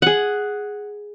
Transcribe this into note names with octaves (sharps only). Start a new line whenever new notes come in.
G#4 F#5